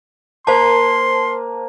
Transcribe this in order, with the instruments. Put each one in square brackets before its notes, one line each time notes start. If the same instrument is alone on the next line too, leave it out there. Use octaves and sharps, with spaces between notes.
[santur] A#3 [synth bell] C5 A5 [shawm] C6